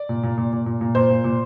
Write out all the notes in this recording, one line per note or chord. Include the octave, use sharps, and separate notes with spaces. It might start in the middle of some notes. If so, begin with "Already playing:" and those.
Already playing: D5
A#2
A#2
A#2
A#2
A#2
A#2
A#2 C5
A#2
A#2